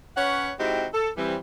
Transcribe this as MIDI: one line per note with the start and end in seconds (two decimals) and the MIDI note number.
0.17 0.52 61
0.17 0.52 71
0.17 0.52 73
0.17 0.52 78
0.59 0.87 56
0.59 0.87 60
0.59 0.87 63
0.59 0.87 64
0.59 0.87 66
0.59 0.87 67
0.94 1.10 69
1.17 1.36 52
1.17 1.36 55
1.17 1.36 60